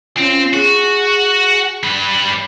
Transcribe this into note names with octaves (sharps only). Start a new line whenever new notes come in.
C4 C#4 F4
F#4 G#4
G3 B4